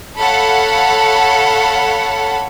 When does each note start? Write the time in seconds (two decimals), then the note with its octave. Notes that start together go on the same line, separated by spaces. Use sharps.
0.18 A4 C#5 F5 F#5 B5